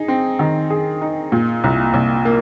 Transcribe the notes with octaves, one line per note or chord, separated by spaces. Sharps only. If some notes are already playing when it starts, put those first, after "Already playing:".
Already playing: D#4 G#4
C4
D#3
G#4
D#4
A#2
C2
C2
A#3